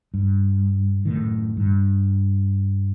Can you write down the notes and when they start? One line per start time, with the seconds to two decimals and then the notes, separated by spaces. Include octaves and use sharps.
0.14 G2
1.05 F#2 A2 D#3
1.57 G2